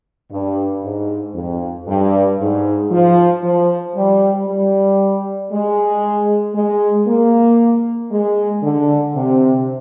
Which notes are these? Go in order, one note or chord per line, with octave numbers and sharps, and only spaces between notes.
G2
G#2
F2
G2
G#2
F3
F3
G3
G3
G#3
G#3
A#3
G#3
D3
C3